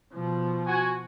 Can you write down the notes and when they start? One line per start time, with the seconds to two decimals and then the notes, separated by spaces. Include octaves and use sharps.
0.13 B2 F3
0.67 F#4 G#5